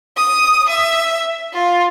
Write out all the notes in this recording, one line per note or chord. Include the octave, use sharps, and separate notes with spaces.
D#6
E5
F4